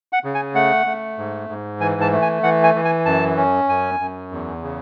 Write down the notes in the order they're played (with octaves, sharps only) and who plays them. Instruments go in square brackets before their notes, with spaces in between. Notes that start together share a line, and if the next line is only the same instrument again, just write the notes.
[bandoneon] F#5
C#3
G#5
A3 F#5
A3
G#2
G#2
E3 G#5
A5
A3
G#5
E3 F#5
G#5
E3
G#5
F#2 A5
C#4
F#2 G#5
F#2
E2
C#3